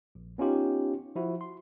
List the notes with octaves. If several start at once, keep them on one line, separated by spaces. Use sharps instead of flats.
A#1
B3 C#4 D#4 F4 G4
F3 E4 F#4
C6